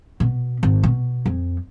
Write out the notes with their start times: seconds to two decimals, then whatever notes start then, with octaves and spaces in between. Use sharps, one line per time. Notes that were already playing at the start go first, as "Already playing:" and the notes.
0.20 B2
0.63 G#1
0.83 B2
1.26 F2